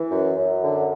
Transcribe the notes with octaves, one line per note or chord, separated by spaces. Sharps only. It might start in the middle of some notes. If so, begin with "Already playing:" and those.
Already playing: E3
F#2
F#2
D3